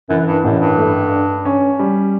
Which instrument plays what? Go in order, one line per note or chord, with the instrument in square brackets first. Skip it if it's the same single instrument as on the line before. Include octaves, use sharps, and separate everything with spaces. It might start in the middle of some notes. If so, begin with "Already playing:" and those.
[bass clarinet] F#2 [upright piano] E3
[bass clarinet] F#2
G2
[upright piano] A1 [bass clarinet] F#2
[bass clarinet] G2
[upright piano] A3
D4
C#4
G3